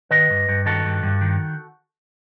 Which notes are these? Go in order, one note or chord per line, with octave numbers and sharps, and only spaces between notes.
D#3 B4 D#5
G2
G2
D#3 F#4 A4
G2
G2
D#3